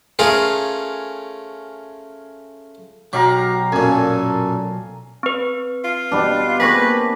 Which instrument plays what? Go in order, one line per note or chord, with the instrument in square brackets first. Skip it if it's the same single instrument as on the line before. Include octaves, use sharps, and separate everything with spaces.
[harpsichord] A3 C#4 F4 G#4 A#4
[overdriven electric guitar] B1 [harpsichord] F#3 [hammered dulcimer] G4 F5 A#5
[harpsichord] F#2 A#2 [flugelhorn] A4 [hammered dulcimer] G#5
[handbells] C4 B4
[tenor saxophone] F4
[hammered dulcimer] B2 G3 D4
[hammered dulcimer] A#3 C4 G#4 [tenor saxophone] B4 [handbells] C#6 A#6 B6